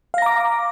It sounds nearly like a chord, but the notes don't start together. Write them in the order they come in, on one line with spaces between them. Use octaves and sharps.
F5 A#6 A#5 D6